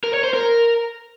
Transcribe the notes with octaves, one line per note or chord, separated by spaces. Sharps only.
A#4
C#5
C5
A#4